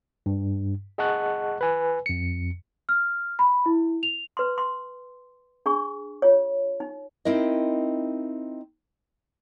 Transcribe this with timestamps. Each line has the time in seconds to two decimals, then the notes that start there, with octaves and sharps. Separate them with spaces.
0.26 G2
0.98 G#4 D#5 F#5 A5 C#6 F#6
1.61 B4 G#5
2.06 F2 C#7
2.89 F6
3.39 B5
3.66 E4
4.03 F7
4.37 B4 C6
4.58 C6
5.66 D4 G#4 C#6
6.22 F4 C#5
6.80 D#4
7.25 C4 D#4 E4 A#4 D#5